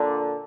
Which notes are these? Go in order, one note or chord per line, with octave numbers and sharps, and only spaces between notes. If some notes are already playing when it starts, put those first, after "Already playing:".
Already playing: A#2 D3